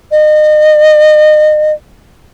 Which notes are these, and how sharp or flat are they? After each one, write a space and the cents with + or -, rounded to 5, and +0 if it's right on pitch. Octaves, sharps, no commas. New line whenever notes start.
D#5 -30